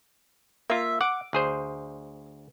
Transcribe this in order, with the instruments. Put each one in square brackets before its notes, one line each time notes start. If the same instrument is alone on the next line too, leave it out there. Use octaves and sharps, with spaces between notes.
[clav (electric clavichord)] A#3 F4 [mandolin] E5
[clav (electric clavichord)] F#5 [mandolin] D6
[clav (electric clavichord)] D2 G#4 C5